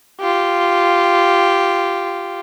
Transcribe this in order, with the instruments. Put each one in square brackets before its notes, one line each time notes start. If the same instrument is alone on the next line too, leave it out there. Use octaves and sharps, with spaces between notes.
[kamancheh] F4 G4